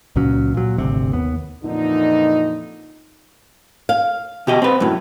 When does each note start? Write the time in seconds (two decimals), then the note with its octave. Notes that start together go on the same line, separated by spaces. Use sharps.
0.16 C#2 A#2 F#3 C#4
0.54 A#2 F#3
0.78 G#1 D2 C3
1.13 D#2 B3
1.63 F2 A#2 D3 E3 D#4
3.89 F5
4.47 B2 G4 D#5
4.62 C4 B4
4.80 F#2 A2